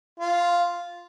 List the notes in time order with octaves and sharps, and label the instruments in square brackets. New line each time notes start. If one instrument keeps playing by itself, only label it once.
[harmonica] F4